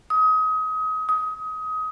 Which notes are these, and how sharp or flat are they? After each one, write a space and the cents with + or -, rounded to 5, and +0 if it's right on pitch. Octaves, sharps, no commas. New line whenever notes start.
D#6 +30
D#6 +25